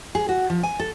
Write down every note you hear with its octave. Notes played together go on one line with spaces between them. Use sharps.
G#4
F#4
F3
G#5
A4